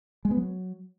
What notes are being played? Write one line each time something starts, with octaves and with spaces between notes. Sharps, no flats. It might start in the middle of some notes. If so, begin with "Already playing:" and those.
G#3
B3
F#3